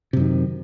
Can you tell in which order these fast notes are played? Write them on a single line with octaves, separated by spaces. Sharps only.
C3 F#2 D#3